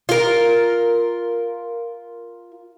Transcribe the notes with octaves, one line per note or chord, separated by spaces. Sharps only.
F4 A#4